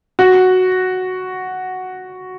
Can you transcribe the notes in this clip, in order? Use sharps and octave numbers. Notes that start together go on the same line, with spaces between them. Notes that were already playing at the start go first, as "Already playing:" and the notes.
F#4